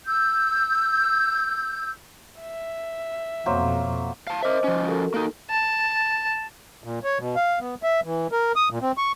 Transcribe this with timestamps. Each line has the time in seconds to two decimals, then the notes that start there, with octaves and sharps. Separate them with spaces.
0.07 E6 G6
2.40 E5
3.46 F2 B2 F#3 A#3 C5
4.27 F5 A5
4.43 A#4 C5 D#5 E5 D6
4.64 F3 C#4
4.88 F#4 A4 A#4
5.14 A#3 D#4
5.50 A5
6.84 A#2
7.04 C#5
7.19 B2
7.36 F5
7.60 B3
7.83 E5
8.04 E3
8.32 A#4
8.56 D#6
8.70 A#2
8.82 C4
8.98 C#6